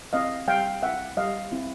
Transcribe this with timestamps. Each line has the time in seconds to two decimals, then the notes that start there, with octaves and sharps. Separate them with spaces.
0.13 C4 E4 D#5 F5
0.48 G3 F5 G5
0.83 C4 E4 E5 F#5
1.17 G3 D#5 F5
1.52 C4 E4